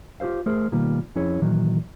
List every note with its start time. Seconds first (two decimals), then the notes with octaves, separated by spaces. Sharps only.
0.20 F4 G4 G#4 C5 F5
0.46 A3 G#4 A#4 C5
0.72 B2 D#3 G3 A#3 F4
1.16 F2 C#4 E4 G#4 C#5
1.42 A#2 D#3 E3 F#3